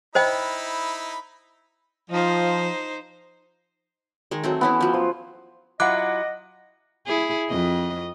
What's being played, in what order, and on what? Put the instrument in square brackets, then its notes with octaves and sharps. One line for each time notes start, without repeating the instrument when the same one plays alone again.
[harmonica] D#4 E4 B5 [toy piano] C5 D#5 G5
[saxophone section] F3 [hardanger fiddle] D#4 C5
[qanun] D#3 G#3
F#3 A3 C4
[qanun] E3 C#4 E4 [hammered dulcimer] B3
[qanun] F3 F#3
[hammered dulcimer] F4 C5
[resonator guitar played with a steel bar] F#3 E4 F4 [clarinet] D#5 [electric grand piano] F#5 D6 [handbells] F#6
[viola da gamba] E4 G#4
F2 D#5